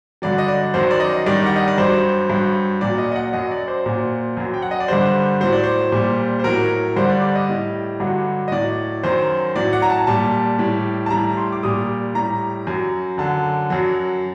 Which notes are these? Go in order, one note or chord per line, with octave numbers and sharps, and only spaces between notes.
G2 D3 F#3 D5
D#5
D5
F#2 D#3 F#3 C5
D5
D#5
G2 D#3 G3 D5
F#5
D#5
D5
G2 F#3 C5
G2 F#3
A#2 F#3 D5
D#5
D#5
F#5
F#2 F#3 D#5
D5
C5
A#2 F#3
F#2 F#3
G5
F#5
D#5
D5
G2 D3 G3 C5
A2 F#3 C5
D5
C5
A#2 G3
C5
A2 F#3 A#4
G2 D3 G3 C5
D5
D5
D#5
A2 G3
G2 D3 F#3
D#5
A2 F#3 D5
F#2 D#3 F#3 C5
A2 F#3 D5
F#5
A#5
A5
A#2 G3 A5
A2 G3
A5
A2 G3 A#5
C6
D6
A#2 G3 D#6
A2 G3 A#5
F#2 F#3
F#2 D3 F#3 A5
F#2 F#3